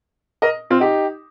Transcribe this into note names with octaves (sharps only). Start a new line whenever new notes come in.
A#4 D#5
C4 F4
D#4 G4